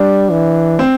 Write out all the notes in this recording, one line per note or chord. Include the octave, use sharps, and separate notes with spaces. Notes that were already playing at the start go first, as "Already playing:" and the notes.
Already playing: G3 D4
E3
C4